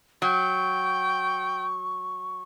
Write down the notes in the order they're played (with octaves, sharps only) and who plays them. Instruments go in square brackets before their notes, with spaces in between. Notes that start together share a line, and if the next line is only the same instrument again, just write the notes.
[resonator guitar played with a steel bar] F#3 [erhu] G5 [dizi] C#6